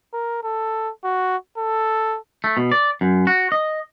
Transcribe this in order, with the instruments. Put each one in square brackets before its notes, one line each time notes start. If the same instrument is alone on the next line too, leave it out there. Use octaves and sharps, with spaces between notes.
[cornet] A#4
A4
F#4
A4
[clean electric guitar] A3
B2
D5
F#2
F#4
D#5